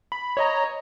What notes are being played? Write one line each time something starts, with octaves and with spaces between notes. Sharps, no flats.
B5
C#5 D#5 A#5